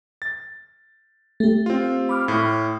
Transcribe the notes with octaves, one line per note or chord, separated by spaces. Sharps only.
A6
A3 G4
C4 F4
B5 D6 F6
A2